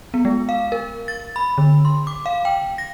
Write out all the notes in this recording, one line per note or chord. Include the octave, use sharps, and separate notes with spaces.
B3
G#3
F5
A#4
A6
B5
D3
C6
D6
F5
G5
A#6